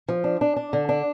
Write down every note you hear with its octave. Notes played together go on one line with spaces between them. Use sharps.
F3
D4
D4
D4
D3
D4